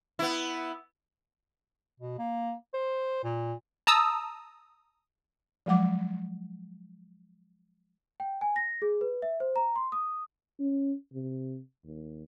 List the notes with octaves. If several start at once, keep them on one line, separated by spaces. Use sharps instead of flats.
B3 E4
B2
A#3
C5
A#2
A5 A#5 D#6 E6
F3 F#3 G#3 F#5 D6
G5
G#5
A#6
G#4
B4
E5
C5
A#5
C6
D#6
C#4
C3
D#2